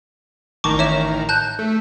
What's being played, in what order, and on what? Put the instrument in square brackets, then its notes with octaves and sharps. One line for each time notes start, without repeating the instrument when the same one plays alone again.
[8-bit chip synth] A1 D#3 A#5 [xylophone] A5 C#6 D6
[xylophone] C#5 E5 E7
A5 F#6 G6
[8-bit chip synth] A3